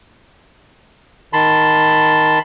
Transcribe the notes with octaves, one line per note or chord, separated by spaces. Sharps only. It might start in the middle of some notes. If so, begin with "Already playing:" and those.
D#3 A5 B5 C6